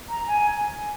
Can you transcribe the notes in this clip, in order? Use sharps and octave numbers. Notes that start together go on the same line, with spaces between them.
A#5
G#5